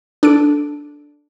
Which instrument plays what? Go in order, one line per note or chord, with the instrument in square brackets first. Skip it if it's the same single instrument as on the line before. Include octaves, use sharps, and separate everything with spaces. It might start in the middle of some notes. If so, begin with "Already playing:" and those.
[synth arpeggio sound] D4 A4 D7